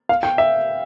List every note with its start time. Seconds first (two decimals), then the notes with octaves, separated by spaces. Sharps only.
0.09 F5
0.23 G5
0.38 E5